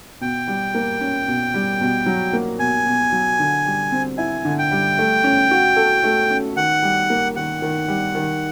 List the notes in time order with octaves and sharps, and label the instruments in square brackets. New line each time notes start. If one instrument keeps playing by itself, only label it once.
[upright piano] B2 [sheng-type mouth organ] G5
[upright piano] G3
A#3
C#4
B2
G3
B2
F#3
A#3
[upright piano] B2 [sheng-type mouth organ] G#5
[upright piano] B2
F#3
D3
G3
C4
[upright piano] E4 [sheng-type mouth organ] G#5
[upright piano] D3
[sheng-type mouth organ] G5
[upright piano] G3
A3
C#4
F#4
A4
A3
C#4
[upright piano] D#3 [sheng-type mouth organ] F#5
[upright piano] G3
A#3
[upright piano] D#3 [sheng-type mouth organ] F#5
[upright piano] D#3
G3
D#3